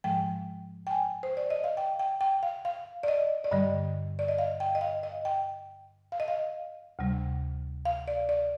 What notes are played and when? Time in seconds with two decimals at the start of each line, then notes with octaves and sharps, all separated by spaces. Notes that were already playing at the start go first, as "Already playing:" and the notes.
0.04 G#2 F3 G#3 G5
0.87 G5
0.91 G#5
1.23 C5
1.37 D5
1.50 D#5
1.64 F5
1.77 G5
1.99 G5
2.21 G5
2.43 F5
2.65 F5
3.03 D5
3.08 D#5
3.44 D5
3.51 G2 D3 G3 D#5
4.19 D5
4.28 D#5
4.38 F5
4.60 G5
4.75 D#5
4.81 F5
5.03 D#5
5.25 G5
6.12 F5
6.20 D#5
6.28 F5
6.99 D2 C3 G3
7.85 F5
8.08 D5
8.29 D5